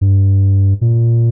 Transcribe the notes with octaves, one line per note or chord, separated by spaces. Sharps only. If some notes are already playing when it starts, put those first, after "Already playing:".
G2
A#2